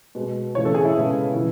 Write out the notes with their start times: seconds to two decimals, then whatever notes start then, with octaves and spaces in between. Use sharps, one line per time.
0.15 B2 G#3 B3
0.55 C#3 E3 A3 C#5
0.65 A4
0.75 G#4
0.85 E4
0.95 C#3 G#3 B3
1.35 C#3 E3 B3